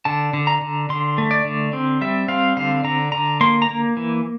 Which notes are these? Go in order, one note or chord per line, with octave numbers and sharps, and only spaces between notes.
D3 A5
D3
A#5
D3
D3 C6
A3
D5
D3
C4
G3 E5
C4 F5
D3 F5
D3 A#5
D3 A#5
A#3 C6
A#5
A#3
E3